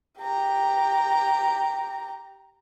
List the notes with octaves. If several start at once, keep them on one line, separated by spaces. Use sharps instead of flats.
G4 A#5